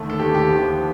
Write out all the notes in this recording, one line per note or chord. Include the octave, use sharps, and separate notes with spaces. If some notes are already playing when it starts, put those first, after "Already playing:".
Already playing: D#2 D3 A3
A4
D#2 D3 A3 G4
G4
D#2 D3 F3
F3